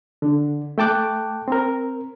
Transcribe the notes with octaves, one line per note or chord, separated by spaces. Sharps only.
D3
A3 G5 A5 D6 F#6
C4 A#4